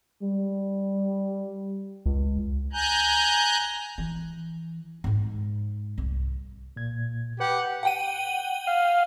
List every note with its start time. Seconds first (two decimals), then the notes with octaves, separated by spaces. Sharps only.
0.22 G3
2.06 C#2
2.73 G#5 A#5 F#6 G6
3.98 E3
5.04 G#2 G#3
5.98 C2
6.76 A#2 G#6
7.40 G4 B4 F#5
7.83 F#5 G5 D#7
8.67 F5